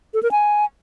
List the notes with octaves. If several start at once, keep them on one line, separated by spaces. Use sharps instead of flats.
A4
A#4
G#5